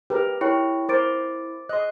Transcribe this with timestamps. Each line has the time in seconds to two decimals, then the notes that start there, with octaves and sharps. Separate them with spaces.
0.10 G4 A#4 B4
0.41 E4 A#4 C#5 G5 C#6
0.89 A#4 C5 D6 A6 D7
1.69 D#5 C6 F#6